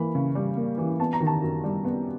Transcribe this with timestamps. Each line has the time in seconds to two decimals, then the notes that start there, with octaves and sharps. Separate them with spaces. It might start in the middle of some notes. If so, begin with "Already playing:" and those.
Already playing: E3 A#3 B5
0.15 C#3
0.35 G3
0.57 A#3
0.78 E3
0.99 B3 A5
1.13 A#5
1.20 D#3
1.27 A5
1.42 F#2
1.64 G3
1.85 B3